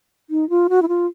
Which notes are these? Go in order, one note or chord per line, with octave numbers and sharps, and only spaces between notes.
D#4
F4
F#4
E4
F4